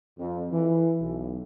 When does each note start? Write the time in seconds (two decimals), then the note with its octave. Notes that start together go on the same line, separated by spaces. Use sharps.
0.19 F2
0.52 E3
1.01 B1